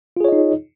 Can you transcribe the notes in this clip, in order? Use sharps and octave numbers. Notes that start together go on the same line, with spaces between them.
D#4 F4 G#4 C#5 D#5